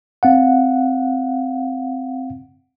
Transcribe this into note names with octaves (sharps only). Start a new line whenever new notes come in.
C4 F5 F#5